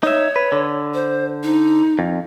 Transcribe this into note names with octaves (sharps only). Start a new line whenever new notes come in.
D#4 C#5 E5
B4
D3
C5
D#4
F2